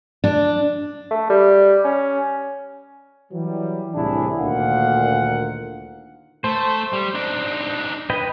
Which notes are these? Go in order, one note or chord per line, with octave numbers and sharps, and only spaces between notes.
D4
A3
G3
C#4
E3 F#3 G3
C2 A2 D4 E4 G#4
D2 A#2 D#3 F5 F#5
A3 C5
G3
D4 D#4
B4 D#5 G5